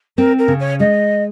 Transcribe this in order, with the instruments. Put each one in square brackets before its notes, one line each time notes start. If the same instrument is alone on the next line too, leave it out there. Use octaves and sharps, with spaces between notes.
[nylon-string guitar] C4 [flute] A#4
[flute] A#4
[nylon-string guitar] C#3
[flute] C#5
[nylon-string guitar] G#3 [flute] D#5